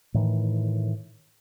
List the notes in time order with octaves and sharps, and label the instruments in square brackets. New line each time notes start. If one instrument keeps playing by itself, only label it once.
[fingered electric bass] A2 D#3 E3